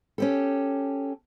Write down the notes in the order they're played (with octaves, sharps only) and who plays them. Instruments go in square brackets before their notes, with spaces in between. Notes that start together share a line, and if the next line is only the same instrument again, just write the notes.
[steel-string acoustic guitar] C#4 G4 A4